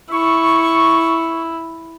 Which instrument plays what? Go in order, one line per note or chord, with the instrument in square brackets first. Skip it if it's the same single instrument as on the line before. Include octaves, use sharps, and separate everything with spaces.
[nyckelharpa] E4 [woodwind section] C#6